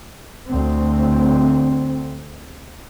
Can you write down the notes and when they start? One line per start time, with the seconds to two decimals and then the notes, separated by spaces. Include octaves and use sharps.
0.50 D2 C4